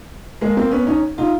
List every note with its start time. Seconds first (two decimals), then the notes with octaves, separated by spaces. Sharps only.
0.41 G#3 A#3
0.57 A#3 C4
0.71 B3 C#4
0.87 C#4 D#4
1.18 D#4 F4